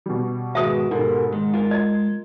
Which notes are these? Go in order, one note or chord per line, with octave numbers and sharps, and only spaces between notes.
B2 G3
G#2 D#3 F#4 B4 D#5 E5 D#6
G#2 B2 G4 A4 A#4
D#3 G#3
F4 A#4
D#5 G#6